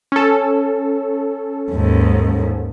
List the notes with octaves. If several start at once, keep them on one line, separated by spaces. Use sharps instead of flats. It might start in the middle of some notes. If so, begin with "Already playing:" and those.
C#4 A4
D#2 G#2